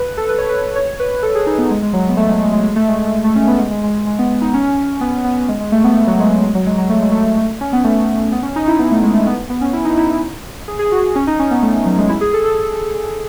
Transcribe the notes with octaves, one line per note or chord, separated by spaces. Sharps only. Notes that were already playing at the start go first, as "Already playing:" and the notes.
Already playing: B4
A4
B4
C#5
B4
C#5
B4
A4
G#4
D#4
B3
G#3
G#3
F#3
B3
A3
G#3
G#3
G#3
G#3
A3
G#3
A3
C#4
B3
G#3
G#3
G#3
G#3
B3
D#4
C#4
B3
B3
G#3
G#3
A3
B3
A3
F#3
G#3
F#3
G#3
F#3
G#3
F#3
A3
G#3
A3
A3
C#4
B3
A3
B3
C#4
D#4
E4
B3
A3
G#3
A3
B3
B3
C#4
E4
D#4
E4
G#4
G#4
F#4
C#4
D#4
C#4
B3
A3
F#3
G#3
E4
G#4
A4
A4